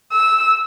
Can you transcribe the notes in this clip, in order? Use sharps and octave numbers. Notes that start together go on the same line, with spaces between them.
E6